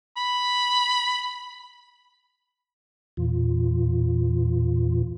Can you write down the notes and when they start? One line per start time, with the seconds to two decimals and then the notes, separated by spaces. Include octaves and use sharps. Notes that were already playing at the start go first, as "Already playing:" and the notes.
0.17 B5
3.17 E2 A#2 E3 F4